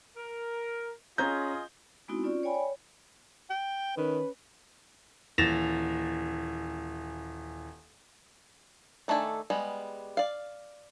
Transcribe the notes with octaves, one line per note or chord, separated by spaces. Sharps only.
A#4
C#4 F4 G#4 D#5 A#5 G6
G#3 B3 C4 D#4 E4 F#4
C#4 F4 D5
C#5 D5 G5 G#5 B5
C#5
G5
D#3 C#4 B4
D#1 E3 A6 A#6 E7 F7
D#3 A3 D4 A4 G#5
G3 G#3 B3
D5 F5